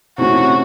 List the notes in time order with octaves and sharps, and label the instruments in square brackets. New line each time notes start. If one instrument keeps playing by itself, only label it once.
[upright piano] C3 E3 A3 C#4 [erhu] F#4